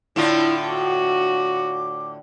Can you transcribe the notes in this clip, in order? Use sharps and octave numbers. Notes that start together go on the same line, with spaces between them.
A2 D3 E4 F4
F#4 D6